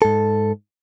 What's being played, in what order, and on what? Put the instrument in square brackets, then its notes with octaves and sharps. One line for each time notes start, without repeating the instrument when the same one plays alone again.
[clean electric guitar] G#2 A4